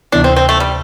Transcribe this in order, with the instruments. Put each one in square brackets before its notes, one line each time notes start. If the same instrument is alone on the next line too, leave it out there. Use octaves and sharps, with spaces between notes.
[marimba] D2 C3 E3 B3 E4 [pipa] D4
[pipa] C4
C4
A3
G3